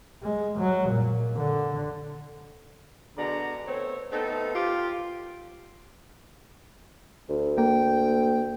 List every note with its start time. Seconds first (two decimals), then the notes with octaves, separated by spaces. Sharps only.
0.23 G#3
0.59 F#3
0.90 A#2
1.36 D3
3.17 B2 D3 G#3 D5 A#5
3.67 A3 B3 C4 C#5
4.12 A3 B3 C4 D#4 A4
4.55 F4 G4
7.29 D2
7.58 A#3 G5